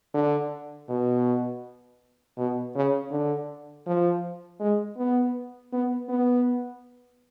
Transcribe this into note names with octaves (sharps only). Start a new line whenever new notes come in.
D3
B2
B2
C#3
D3
F3
G#3
B3
B3
B3